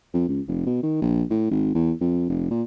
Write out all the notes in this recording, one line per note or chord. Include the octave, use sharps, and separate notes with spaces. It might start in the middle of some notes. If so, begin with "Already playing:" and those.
F2
C#2
F1
B2
D#3
A#1
A2
G#1
E2
F2
F1
A#2